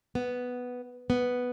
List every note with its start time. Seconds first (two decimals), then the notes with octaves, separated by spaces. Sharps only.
0.15 B3
1.10 B3